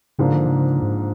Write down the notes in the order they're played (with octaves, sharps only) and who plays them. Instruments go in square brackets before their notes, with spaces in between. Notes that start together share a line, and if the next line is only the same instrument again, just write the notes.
[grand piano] G#2 F3 A#3 D4 [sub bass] C#3
[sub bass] D3
C#3
G#2